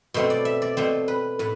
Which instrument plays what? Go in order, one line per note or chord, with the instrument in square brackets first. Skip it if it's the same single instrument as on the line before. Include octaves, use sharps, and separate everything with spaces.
[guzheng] B2 A3 C4 C5
D5
E5
D5
B2 A3 C4 C5
B4
A2 B4